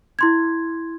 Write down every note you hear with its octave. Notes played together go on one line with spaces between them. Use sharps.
E4 C6 G#6